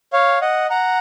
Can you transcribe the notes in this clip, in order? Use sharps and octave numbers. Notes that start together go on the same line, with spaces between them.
C#5 F5
D#5 F#5
F#5 A#5